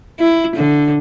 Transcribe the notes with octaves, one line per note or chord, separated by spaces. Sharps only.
E4
D3